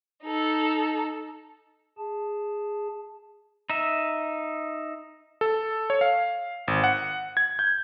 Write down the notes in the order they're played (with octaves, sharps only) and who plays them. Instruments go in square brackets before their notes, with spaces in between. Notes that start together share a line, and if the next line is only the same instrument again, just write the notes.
[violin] D#4 A4
[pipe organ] G#4 A5
[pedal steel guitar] D#4 E5
[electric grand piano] A4
C#5
F5
G#1
F#5
G#6
G6